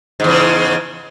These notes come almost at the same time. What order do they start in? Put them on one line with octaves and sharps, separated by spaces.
G#2 E2 C#3